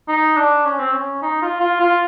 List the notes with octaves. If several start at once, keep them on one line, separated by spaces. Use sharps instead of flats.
D#4
D4
C#4
C4
C#4
D#4
F4
F4
F4